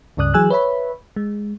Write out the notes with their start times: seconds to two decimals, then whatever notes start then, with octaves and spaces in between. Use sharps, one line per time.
0.17 C#2 G2 C#3 D5 D#6 F#6
0.34 E3 F#3 G#4 G#5 E6 F#6
0.50 B4 C#5 E5 B5
1.16 G#3